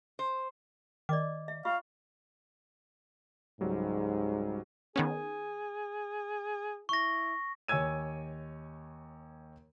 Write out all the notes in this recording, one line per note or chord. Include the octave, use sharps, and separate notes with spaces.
C5
D#3 D5 D#5 D6
E5
F4 E5 F5 C#6
C#2 G#2 F#3 G3
D#3 B3 C#4 G#4
E4 C#6 A#6
D#2 C#5 G#5 E6 G#6 D#7